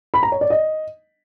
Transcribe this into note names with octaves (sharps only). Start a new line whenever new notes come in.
B5
A#5
C#5
D5
D#5